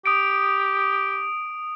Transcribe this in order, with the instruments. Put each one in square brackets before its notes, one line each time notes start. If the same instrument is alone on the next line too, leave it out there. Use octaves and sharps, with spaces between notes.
[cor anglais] G4 [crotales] D#6 D7